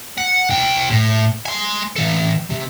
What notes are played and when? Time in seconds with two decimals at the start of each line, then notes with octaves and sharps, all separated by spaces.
0.18 F#5
0.49 C2 G5
0.90 A2
1.46 G#5 C6
1.96 E3 A4
2.50 C3